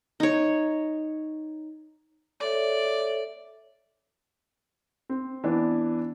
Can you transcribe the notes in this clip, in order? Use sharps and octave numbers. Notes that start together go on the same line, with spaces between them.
D#4 C#5
A4 C#5 D5 E5
C4
E3 B3 D4